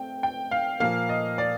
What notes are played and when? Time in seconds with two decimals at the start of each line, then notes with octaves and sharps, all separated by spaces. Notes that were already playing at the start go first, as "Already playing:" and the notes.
Already playing: A3 C4 G5
0.23 G5
0.51 F5
0.80 A#2 F3 A#3 F5
1.09 D#5
1.38 D5